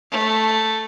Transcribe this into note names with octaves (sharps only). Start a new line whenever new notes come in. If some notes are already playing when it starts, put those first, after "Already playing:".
A3